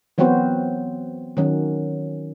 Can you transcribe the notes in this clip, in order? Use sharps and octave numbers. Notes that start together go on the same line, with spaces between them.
E3 F#3 B3 C4 F#4 C5
D#3 F#3 C#4